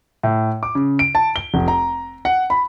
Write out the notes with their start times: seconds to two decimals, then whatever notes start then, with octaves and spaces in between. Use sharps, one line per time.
0.23 A2
0.63 D6
0.75 C#3
0.99 D7
1.15 A5
1.36 G7
1.54 F1
1.68 A#5
2.25 F#5
2.50 B5